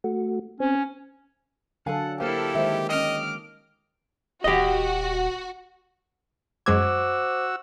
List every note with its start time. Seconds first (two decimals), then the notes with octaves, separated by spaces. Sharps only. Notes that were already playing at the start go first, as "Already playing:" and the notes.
0.04 A3 F#4
0.60 C4 C#4
1.86 D3 F#3 A4 F5 F#5 G#5
2.20 A#3 E4 G4 A4 C5 F5
2.55 D#3 G#3 C5 E5
2.89 C#4 D#5 G5 D6 F6
4.44 D#1 F#4 G4 D#5
6.66 F#2 G#3 F#4 C5 D6 E6 G#6